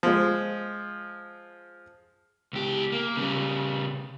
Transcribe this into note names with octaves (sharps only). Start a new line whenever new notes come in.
F3 G#3
C#2 G4
A#3
C#3 G3